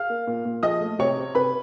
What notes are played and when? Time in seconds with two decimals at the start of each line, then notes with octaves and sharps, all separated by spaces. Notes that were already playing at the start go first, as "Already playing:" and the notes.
Already playing: F5 F6
0.10 A#3
0.27 A#2
0.45 A#2
0.63 F3 D#5 D#6
0.81 A3
0.99 C3 C#5 C#6
1.17 C4
1.35 C3 B4 B5